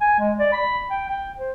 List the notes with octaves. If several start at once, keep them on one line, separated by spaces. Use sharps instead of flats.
G#5
G#3
D5
B5
G5
G5
C5